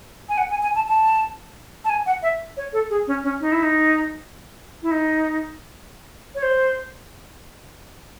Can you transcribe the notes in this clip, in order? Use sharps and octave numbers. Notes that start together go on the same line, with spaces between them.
G#5
F#5
G#5
G#5
A5
A5
A5
G#5
F#5
E5
C#5
A4
G#4
C#4
C#4
D#4
E4
D#4
E4
D#4
C#5
C5